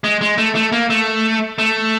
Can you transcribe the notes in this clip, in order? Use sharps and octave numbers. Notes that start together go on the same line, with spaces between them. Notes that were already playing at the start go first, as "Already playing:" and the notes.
G#3
G#3
A3
A3
A#3
A3
A3